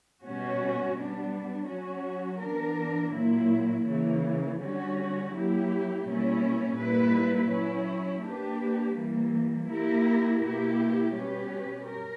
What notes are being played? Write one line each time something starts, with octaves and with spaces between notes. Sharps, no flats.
B2 G3 C#4 F#4
G3 B3 D4
F#3 C#4 F#4
E3 B3 D4 A#4
A#2 F#3 A#3 E4
C#3 E3 A#3
D3 G3 C#4 F#4
F#3 A#3 E4 G4
B2 G3 A#3 C#4 E4
A#2 G3 A#3 E4 B4
F#3 C#4 E4
A#3 D4 G4 B4
E3 G3 A#3
A#3 E4 G4 A#4
B2 A#3 E4 G4
B2 G3 C#4 G4 B4
A#4